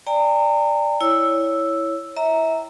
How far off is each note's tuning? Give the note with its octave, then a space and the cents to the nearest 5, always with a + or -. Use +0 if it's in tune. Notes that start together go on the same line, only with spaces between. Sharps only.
D5 +0 G5 +40 A#5 -35
E4 +0 C#5 +0 E6 +0
E5 -30 G5 -5 A#5 +0